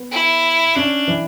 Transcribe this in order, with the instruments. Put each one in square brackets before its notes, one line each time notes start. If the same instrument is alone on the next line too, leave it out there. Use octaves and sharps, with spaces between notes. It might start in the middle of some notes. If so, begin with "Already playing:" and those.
Already playing: [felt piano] B3
[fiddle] E4
[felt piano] C#4 [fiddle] D4
[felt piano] E3